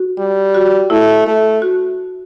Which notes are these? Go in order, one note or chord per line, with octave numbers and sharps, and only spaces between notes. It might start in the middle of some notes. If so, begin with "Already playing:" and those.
Already playing: F#4
G3
F#4
A3 E4
A3
F#4